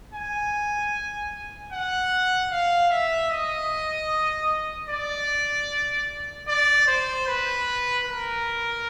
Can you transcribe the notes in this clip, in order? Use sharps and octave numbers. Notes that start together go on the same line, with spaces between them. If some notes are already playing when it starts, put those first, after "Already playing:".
G#5
F#5
F5
E5
D#5
D5
D5
C5
B4
A#4